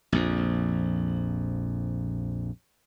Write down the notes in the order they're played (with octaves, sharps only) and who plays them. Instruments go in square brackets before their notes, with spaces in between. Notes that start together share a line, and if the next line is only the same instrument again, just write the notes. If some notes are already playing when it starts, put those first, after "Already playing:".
[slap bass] A#1 F2